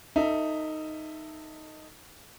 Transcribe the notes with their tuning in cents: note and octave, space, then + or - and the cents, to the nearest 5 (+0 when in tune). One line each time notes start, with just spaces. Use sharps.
D#4 +0 A4 +30 E5 +0